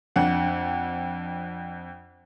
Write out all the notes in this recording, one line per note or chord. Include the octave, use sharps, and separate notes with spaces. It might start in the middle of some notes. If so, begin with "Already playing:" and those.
F2 D4 F#5